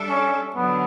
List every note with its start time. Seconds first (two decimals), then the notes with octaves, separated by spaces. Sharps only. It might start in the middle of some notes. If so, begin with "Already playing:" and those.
Already playing: G3 D4 A4 E5
0.10 C#4
0.56 D3 F#3 B3